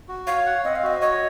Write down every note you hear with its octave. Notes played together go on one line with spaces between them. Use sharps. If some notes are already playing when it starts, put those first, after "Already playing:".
F#4
C#5 F5
F#5
C4 D#5
F5
F#4 D#5
C#5 D#5